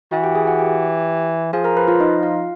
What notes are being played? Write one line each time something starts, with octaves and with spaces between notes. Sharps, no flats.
E3 F#4 F#5
G4 G5
G#4 G#5
F#4 F#5
G4 G5
F3 G#4 G#5
A#4 A#5
B4 B5
F4 F5
D#4 D#5
F4 F5